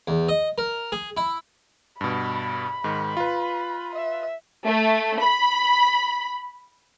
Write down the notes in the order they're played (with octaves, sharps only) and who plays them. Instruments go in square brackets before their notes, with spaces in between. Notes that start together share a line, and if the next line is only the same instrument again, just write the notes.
[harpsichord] E2
D#5
A#4
G#4
E4
[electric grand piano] G2 B2 [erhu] B5
[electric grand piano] G#2 D#3
F4 B4
[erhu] E5
[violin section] A3
B5